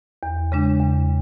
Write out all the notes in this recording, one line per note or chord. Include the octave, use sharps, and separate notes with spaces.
E2
C#3 G#3 D4
E2